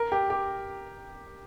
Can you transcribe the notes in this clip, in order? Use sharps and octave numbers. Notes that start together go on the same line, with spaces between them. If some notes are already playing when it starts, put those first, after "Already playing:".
Already playing: A#4
G4
G4